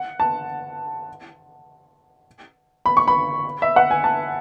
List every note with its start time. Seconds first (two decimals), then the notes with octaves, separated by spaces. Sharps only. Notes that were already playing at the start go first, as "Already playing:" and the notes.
Already playing: F#5
0.20 A5
2.86 B5
2.97 C#6
3.08 B5
3.62 E5
3.76 F#5
3.91 G#5
4.04 A5